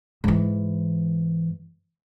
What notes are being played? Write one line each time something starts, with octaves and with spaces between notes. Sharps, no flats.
G#2 E3